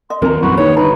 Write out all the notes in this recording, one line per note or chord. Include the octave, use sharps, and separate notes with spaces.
D#5 C6
D#2 C4 A#4 A#5
A#1 F#2 E3 F#4 B5
D#2 D#4 B4 C#5
G1 B4 A#5